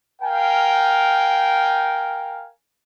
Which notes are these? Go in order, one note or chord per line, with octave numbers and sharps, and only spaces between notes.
A#4 F5 G5 G#5